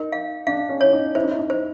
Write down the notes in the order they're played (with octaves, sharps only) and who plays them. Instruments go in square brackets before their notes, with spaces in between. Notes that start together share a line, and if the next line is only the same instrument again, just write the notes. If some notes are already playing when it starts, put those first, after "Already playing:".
Already playing: [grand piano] D#4 [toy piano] A#4
[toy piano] F5
[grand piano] D4 [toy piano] F5
[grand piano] C#4
[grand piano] E4 [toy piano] C#5
[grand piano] D#4
[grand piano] E4 [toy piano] C5
[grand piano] D#4
E4
D#4
[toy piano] C5